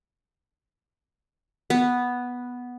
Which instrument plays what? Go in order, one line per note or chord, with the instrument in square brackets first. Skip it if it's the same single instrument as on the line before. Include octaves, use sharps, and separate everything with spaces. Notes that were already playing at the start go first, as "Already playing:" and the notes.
[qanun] B3